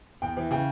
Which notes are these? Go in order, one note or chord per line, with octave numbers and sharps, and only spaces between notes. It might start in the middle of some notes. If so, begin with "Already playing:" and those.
E2 G5
E3
C#3 G5